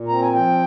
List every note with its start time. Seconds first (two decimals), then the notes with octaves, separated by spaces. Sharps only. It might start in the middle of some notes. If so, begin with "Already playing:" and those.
Already playing: A#2
0.08 C4 A#5
0.21 G#5
0.33 F3 G5